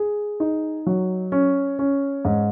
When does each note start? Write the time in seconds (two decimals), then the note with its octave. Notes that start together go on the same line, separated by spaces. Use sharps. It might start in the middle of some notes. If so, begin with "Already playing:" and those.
Already playing: G#4
0.40 D#4
0.87 F#3
1.32 C#4
1.79 C#4
2.25 G#2